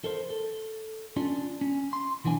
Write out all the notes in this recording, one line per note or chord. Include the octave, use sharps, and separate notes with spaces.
A4 A#4 C5
A4
C#4 D4 F4
C#4
C6
B1 E3 B3 D4 G#5